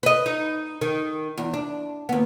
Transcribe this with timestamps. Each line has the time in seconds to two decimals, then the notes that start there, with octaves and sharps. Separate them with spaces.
0.03 B4 D#5
0.26 D#4
0.81 D#3
1.38 E2
1.54 D4
2.09 D#2 B3